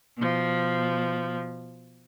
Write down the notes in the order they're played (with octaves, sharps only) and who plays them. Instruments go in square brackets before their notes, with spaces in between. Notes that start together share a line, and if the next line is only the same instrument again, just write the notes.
[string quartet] B2 F3